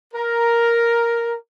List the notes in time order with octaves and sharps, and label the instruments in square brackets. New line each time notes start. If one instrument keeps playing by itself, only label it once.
[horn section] A#4